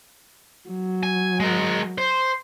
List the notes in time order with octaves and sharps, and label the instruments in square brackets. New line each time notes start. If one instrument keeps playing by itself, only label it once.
[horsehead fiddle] F#3
[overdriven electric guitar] G#5
G#3 A#4
C5